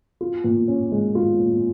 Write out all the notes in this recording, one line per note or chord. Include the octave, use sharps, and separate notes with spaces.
F4
A#2
C#4
G#3
F4
A#2